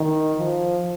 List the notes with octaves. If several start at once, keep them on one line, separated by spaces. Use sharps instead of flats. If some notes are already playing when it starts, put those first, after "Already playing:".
Already playing: D#3
F3